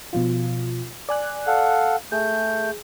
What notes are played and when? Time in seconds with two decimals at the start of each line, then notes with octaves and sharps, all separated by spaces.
0.13 B2 F3 F4
1.09 D5 G#5 F#6
1.47 A4 F5 F#5
2.12 A3 G#4 G6